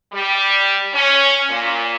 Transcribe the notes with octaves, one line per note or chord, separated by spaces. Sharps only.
G3
C#4
A#2